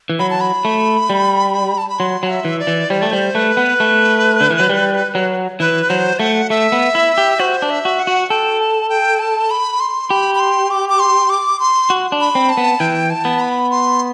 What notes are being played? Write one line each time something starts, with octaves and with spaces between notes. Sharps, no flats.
E3
F#3 B5
A5
B5
A3
G3
A5
B5
F#3 C6
F#3
E5
E3
D5
E3
G3 C5
A3 D5
G3 C5
A3 B4
B3
A3
D3
E3
F#3
G3
F#3
E3 B4
F#3 C5
A3 F#5
A3 E5
B3
E4
G4
F#4 C5
D4
E5
F#4
F#5
F#4
A4 G5
A5
G5
A5
B5
C6
G4 B5
B5
C6
D6
D6
C6
D6
C6
F#4
D4
B5
C4
A5
B3
E3 G5
A5
B3
B5
C6